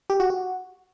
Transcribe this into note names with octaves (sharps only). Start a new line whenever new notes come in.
G4
F#4
F#4